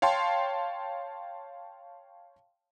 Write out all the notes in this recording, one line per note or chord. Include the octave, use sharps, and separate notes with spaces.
C#5 F5 G5 A5 C6